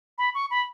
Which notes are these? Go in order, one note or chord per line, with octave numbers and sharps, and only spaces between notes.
B5
C#6
B5